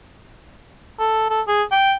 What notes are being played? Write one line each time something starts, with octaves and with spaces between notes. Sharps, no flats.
A4
A4
G#4
G5